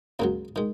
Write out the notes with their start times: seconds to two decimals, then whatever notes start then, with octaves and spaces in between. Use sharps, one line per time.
0.19 C#2 C#3 F#3 A#3
0.56 D#3 G#3